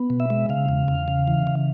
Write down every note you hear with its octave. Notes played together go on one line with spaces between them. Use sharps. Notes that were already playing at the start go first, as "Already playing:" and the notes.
Already playing: B3
B2
E5
G#3
C#3 F5
E2
E2
C#3
E3
C#3